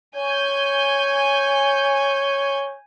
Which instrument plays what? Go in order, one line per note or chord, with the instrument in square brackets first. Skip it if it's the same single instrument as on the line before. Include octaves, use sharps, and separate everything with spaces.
[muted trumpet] C#5 [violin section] G#5 G6